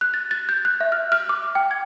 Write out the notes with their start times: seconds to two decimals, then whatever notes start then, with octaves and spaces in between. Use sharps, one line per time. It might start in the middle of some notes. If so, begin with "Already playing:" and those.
0.01 F#6
0.14 A6
0.31 A6
0.49 G6
0.65 F#6
0.81 E5
0.92 F6
1.12 F6
1.29 D6
1.55 G5
1.71 G#6